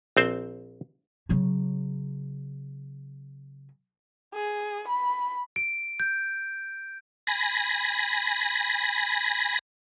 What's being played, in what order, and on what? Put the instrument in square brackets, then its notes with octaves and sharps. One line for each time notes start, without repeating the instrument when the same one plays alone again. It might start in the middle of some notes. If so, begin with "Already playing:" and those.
[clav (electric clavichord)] A#1 C4 C5
[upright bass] C#3 F#3
[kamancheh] G#4
B5
[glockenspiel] D7
G6
[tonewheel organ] G#5 B5 A#6